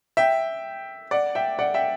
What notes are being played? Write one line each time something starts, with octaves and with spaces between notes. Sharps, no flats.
E5 G5
D5 F#5
E5 G5
D5 F#5
E5 G5